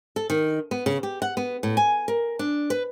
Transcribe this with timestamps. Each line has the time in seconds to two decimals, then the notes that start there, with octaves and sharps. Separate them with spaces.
0.16 A4
0.30 D#3
0.71 B3
0.86 C#3
1.03 G4
1.22 F#5
1.37 B3
1.63 A2
1.77 G#5
2.08 A#4
2.39 D4
2.70 B4